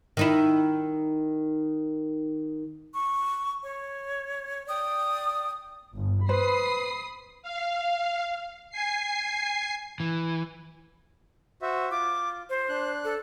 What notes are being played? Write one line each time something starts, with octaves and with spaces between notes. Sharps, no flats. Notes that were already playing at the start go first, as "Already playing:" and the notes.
D#3 D#4 E4
C#6
C#5
D5 G5 D#6
G1
B4 C5 B5 D#6 C7
F5
G#5 C7
E3
F#4 C5 E5
F4 D6
C5
D4 F#6
A4